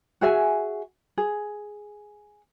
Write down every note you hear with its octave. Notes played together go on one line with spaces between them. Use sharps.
F#4 G#4 E5 G#5
G#4